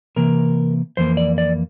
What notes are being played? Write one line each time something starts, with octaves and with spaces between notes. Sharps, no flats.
C3 E3 A#3 A#4
F2 E3 A#3 C5
D5
D5